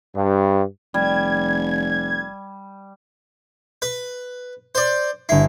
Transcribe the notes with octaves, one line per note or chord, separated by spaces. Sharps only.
G2
F1 G3 G#6
B4
C5 D5
G1 E4 C7